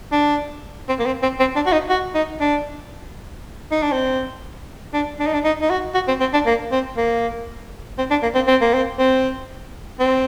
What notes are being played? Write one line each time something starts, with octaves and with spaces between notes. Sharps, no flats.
D4
C4
A#3
C4
C4
C4
D4
F#4
D#4
F#4
D#4
D4
D#4
D4
C4
D4
D4
D#4
D4
D#4
D#4
F#4
F#4
C4
C4
D4
A#3
C4
A#3
C4
D4
A#3
C4
C4
A#3
C4
C4
C4